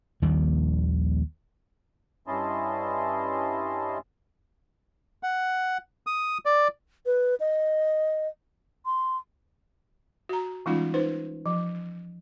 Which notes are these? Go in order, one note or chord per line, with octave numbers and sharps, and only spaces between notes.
A#1 D#2 D#3 G3
G2 C#4 E4 D#5 A5 C6
F#5
D#6
D5
B4
D#5
C6
F#4 A#5
E3 G3 G#3 C#4 D#4 F4
D#4 B4 C5
F3